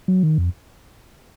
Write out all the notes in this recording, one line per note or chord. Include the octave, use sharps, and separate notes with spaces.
F#3
D#3
F2